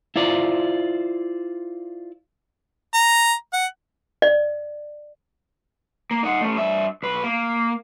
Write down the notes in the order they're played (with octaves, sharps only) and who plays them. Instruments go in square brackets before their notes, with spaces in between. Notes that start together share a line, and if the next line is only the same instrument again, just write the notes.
[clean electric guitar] E4 F4 C5 D5
[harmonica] A#5
F#5
[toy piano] D5
[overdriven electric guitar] A#3
D#4 F#5
A3 C#4
G2 E5
B1 B4
A#3